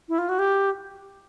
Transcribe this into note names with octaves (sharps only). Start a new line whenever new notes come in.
E4
F4
F#4
G4